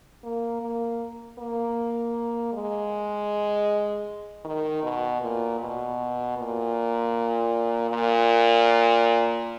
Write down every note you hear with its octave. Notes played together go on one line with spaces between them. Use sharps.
A#3
A#3
A#3
G#3
D#3
B2
A#2
B2
A#2
A#2